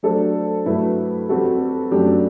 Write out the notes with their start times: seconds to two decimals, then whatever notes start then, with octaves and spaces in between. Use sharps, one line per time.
0.03 F#3 A3 D4 A4 C5
0.66 G2 F#3 A3 E4 B4
1.29 G3 C4 F#4 A4
1.91 F#2 F#3 A3 D4 G4